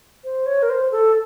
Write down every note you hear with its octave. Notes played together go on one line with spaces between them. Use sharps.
C5
C#5
A#4
C5
A4